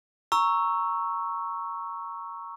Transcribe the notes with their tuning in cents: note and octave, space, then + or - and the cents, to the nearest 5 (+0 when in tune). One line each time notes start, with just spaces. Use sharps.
A#5 +0 C#6 +0 E6 +0